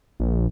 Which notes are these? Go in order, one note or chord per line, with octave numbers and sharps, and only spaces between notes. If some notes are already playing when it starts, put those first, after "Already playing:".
A#1